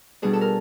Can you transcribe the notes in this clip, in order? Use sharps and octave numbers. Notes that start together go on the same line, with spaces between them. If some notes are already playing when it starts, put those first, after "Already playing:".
B2 G3 B3 D4 G#4
A4
A#4